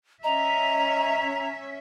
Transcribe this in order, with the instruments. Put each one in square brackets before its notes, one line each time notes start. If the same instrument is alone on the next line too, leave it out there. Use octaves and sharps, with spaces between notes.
[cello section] C#4 E5 [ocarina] D#5 [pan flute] A#5